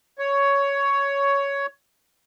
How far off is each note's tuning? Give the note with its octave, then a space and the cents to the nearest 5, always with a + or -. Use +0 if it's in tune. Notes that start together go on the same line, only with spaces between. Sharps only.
C#5 +10